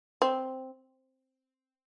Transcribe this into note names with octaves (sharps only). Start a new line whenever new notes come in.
C4